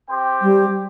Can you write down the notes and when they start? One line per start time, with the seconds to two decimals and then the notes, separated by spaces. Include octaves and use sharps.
0.09 C4 G4 C5 G5
0.42 G3